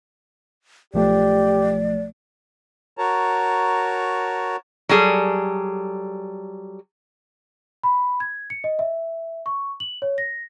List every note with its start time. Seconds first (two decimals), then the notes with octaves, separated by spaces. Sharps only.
0.94 B1 F3 A3 G4 D5
2.97 F#4 A#4 C#5 A5 A#5
4.89 F#3 G3 G#4 A4
7.83 B5
8.20 G#6
8.50 C#7
8.64 D#5
8.79 E5
9.46 C#6
9.80 F#7
10.02 C#5
10.18 A#6